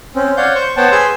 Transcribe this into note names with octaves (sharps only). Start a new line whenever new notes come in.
C4 C#4
C#5 D5 F5 F#5 G6
C5 C#6 G6
B3 C5 C#5 F#5 G5 A5
G#4 B4 G#5 C6 E6 G6